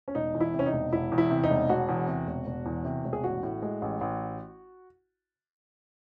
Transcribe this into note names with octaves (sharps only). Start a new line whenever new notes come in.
C#4
E1 D#4
E2
E4
C3
C#4
D#4
E1
E1 E4
E2
E4
C3
D#4
E1
E1 F#4
E2
C3
E1
E1
E2
C3
E1
G#4
A1 F#4
A2
G#3
A1
A1